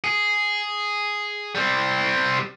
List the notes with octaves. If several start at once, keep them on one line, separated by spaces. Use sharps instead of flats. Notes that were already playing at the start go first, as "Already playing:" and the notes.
G#4
G3 C4